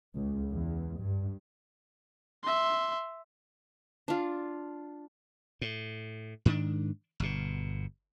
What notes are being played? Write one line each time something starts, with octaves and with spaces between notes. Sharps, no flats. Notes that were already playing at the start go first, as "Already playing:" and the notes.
C#2
E2
G2
E5 C6
D4 F4
A2
G#2 D#3 C4 D4
G1 B2